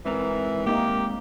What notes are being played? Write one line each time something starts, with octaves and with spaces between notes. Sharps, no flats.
G#2 E3 C4 A#4
A#3 D#4 G4